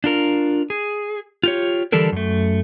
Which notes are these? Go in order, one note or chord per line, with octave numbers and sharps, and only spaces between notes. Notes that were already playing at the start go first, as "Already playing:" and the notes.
D4 F4 A#4
G#4
F4 G4 C#5
D3 E3 G3 D4 A4 A#4
F#2 A3